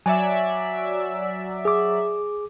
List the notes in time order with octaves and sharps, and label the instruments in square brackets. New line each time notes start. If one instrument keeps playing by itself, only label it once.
[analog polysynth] F#3 D5 E5 [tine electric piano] G#5
[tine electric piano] G#4 D6